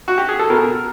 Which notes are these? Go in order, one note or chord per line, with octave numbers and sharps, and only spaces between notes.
F#4
G4
G#4
A4
B2 A#4